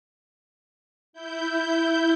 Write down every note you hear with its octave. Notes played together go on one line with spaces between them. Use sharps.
E4 G6